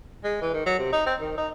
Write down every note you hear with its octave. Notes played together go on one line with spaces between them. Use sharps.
G#3
E3
D#3
F#3
C3
D#4
C4
D#3
D#4